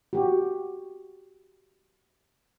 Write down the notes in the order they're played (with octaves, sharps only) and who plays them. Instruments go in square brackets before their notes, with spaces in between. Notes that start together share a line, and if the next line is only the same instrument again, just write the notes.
[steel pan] F#4 G4